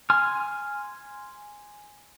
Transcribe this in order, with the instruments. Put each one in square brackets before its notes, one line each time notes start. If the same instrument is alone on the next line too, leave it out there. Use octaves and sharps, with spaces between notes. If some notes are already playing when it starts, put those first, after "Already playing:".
[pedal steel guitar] G#5 C6 F6